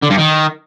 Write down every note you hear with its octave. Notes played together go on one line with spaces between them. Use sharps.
D3
G2
D#3